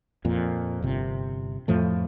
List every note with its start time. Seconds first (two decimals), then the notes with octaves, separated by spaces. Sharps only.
0.25 F2 A#2
0.82 G1 C3
1.68 F2 A2 F3 A3